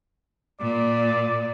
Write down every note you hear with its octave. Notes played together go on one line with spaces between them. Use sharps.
A#2 D5